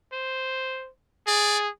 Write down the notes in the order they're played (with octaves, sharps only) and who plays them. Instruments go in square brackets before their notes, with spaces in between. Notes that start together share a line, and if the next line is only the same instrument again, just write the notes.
[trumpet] C5
[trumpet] G#4 [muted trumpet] D5